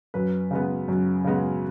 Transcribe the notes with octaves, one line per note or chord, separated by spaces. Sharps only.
F#2 B4
C#3 G#3 B3
F#2
C#3 G#3 B3